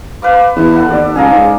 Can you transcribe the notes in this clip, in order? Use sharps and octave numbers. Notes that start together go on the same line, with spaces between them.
B4 F5 D6
E2
A4 F#5
D#2 D5
C#2 G#4 F5 A#5
G#2